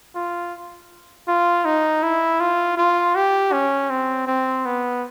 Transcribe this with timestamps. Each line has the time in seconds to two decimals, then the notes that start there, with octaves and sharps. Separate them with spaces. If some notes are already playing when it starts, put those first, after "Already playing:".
0.16 F4
1.28 F4
1.65 D#4
2.03 E4
2.40 F4
2.77 F4
3.15 G4
3.52 C#4
3.90 C4
4.27 C4
4.65 B3